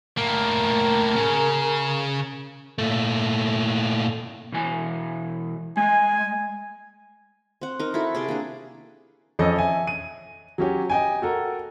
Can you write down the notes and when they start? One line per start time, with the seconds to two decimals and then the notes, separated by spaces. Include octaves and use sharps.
0.17 A2 A#3 A#4
1.16 C#3
2.78 A#2 A3
4.52 B2 E3 G#5
5.77 G#3 G#5
7.61 C4 F#5
7.79 D#4 A#4
7.94 E4 F#4 A4
8.14 C3 G#4 D5
8.28 A#3 D4
9.39 F2 F3 C#4 A4 D#5
9.56 E5 G#5
9.87 D#7
10.58 F#3 C#4 G4
10.90 D#5 G5 G#5
11.22 F#4 A4 A#4